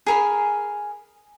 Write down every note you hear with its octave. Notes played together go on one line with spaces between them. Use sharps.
G#4 A#4 B5